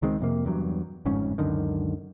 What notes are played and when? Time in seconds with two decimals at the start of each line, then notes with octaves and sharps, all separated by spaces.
0.02 C#2 D#3 G#3 C4
0.20 F2 C3 A#3
0.45 E2 G2 F#3
1.05 G1 F2 G#2 C#4
1.38 C#2 F#2 D3 D#3